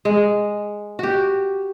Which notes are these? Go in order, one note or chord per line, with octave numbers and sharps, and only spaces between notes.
G#3
F#4 G4